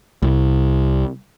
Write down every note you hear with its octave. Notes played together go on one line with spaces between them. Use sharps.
C2